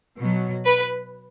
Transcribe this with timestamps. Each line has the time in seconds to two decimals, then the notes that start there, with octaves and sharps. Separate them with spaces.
0.15 B2 F#3
0.65 B4